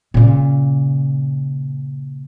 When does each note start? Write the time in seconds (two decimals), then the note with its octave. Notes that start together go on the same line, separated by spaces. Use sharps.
0.14 A#2 C#3